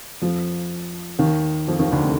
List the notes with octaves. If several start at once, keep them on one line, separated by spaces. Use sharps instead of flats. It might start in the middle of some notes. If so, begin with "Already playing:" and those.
F2 F3
D#2 D#3
F2 F3
D#2 D#3
D2 D3
C3